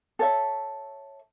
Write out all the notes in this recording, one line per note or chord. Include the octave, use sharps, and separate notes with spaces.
A4 C#5 E5